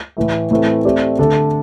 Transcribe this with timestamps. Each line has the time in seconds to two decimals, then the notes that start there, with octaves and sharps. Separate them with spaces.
0.17 A2 E3 A3
0.51 A2 E3 A3 C4
0.85 A3 C4 G4 D5
1.19 D3 A3 D4 A4